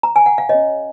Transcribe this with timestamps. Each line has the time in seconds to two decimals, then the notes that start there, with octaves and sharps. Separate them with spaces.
0.03 A#5
0.16 G#5
0.26 F#5
0.38 F5
0.49 C#4 G#4 C#5 D#5